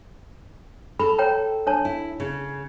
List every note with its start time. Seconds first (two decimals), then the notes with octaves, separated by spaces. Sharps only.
0.99 A4 B5
1.19 C#5 G5 A#5
1.67 D4 C#5 A5
1.85 E4
2.20 C#3